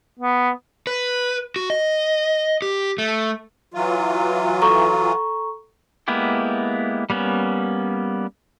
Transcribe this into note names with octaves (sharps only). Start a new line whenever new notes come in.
B3
B4
F#4
D#5
G4
A3
E3 F#3 F4
A4 A#5 C#6
G#3 A#3 B3 E4 G4
G3 A#3 B3 C#4